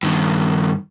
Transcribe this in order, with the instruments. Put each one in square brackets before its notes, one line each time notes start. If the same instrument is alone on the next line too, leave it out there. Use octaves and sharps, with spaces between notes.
[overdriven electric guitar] G2 D#3